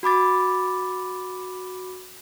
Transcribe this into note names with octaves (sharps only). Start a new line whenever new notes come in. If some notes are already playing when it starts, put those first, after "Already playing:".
F#4 B5 D6 A6